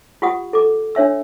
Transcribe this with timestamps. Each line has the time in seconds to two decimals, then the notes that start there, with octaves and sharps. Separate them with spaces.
0.22 F4 G4 F#5 D#6
0.53 A4 D6
0.95 D4 C#5 E5 E6